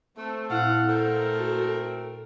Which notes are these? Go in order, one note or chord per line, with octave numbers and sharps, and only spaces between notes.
A3 C4
A#2 E4 A4 F5 F#5 F#6
A3 C4 A4 A#4
F#4